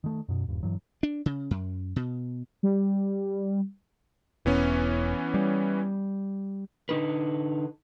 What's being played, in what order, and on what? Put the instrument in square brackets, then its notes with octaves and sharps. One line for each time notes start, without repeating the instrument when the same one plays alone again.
[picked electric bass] D#3 A3
F#2 B2
D#1 G2
G2 E3 F#3
[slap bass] D4
C#3
F#2
B2
[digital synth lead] G3
[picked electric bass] E1 [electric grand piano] E3 B3 C#4
[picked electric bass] G3
[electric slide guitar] D3 D#4 B4